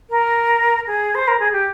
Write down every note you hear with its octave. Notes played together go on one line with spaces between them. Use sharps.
A#4
G#4
C5
A#4
G#4
G4